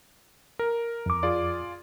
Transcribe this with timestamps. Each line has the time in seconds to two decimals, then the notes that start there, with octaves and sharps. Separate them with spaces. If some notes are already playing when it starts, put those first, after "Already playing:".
0.59 A#4
1.06 F2 D6
1.23 F4 G#4 D5